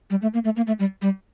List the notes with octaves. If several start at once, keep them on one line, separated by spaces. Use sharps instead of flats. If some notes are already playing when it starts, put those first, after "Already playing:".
G3
A3
A#3
A3
A#3
A3
G3
G3